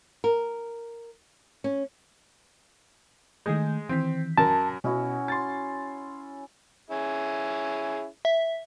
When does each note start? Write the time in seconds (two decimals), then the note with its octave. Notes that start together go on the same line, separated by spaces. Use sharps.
0.24 A#4
1.64 C#4
3.46 D#3 G#3 A3 G#4 G6
3.89 D#3 E3 C4 B6
4.38 F#2 A#4 A5
4.84 B2 C#4 E4 F#4
5.28 C6 A6
6.90 C#4 E4 G#4
8.25 E5